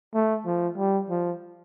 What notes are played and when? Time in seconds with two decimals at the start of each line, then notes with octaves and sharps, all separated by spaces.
0.14 A3
0.46 F3
0.77 G3
1.10 F3